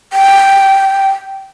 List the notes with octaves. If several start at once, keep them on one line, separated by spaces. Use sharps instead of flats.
G5